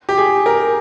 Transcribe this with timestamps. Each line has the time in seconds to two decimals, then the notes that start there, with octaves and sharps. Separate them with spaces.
0.09 G4
0.18 G#4
0.46 A#4